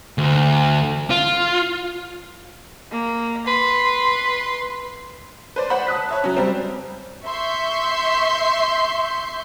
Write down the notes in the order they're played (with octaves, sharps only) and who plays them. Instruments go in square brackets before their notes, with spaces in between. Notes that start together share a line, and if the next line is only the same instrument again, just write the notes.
[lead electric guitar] D2
F4
[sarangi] A#3
[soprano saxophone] B4 [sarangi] C6
[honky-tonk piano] B4 C5 D5
C5 F#5 B5
A5 D#6 F#6 B6
C#5 E5 A5
F#3 C#4
G3 C4 A#5
[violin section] E5 C6 C#6 G6